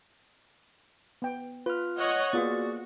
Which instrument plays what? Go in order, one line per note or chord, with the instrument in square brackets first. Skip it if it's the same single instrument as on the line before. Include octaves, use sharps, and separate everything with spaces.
[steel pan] B3 G5
[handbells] F4 F6 [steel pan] B4
[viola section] C#5 D#5 F#5
[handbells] A#3 G#4 D5 [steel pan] B3 F4 [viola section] F#4